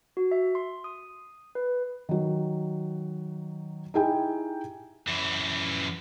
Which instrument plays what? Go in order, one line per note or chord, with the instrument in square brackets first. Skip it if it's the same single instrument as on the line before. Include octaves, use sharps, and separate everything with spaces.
[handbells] F#4
E5
C6
D#6
B4
[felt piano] D#3 F#3
D#4 E4 G4 G#4 G5 G#5
[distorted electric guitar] F#2 E3